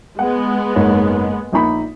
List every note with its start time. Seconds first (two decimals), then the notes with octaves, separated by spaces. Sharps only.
0.19 G#3 B3 F#5
0.76 F#1 G#2 C#5
1.53 A#1 D#4 B5